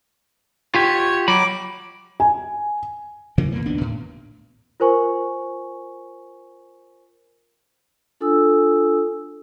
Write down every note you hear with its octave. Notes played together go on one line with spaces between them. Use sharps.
F4 G4 C#5
F#3 B5 D6
G#5
C#3 E3 F#3 A#3
F2 A#3 B3
A#1 D#2 B3 D4
A2
F4 A#4 C5 G#5 C#6
D4 F4 A4 G#5 D#6 E6